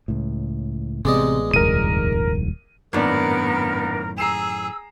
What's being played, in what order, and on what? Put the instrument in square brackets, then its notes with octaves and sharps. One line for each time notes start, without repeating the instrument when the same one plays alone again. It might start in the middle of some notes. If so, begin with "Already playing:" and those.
[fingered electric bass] C#2 A2
[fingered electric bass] A1 B3 [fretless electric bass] C3 [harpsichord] G#3 D5 D#5
[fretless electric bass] D#1 [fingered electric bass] C2 F2 G#2 [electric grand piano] A#4 D#7
[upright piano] G#1 D4 D5 [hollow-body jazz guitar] F#2 A2 D#3 [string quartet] B3 [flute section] A#4
[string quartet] G#4 [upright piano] A#5 C7 E7 [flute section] E6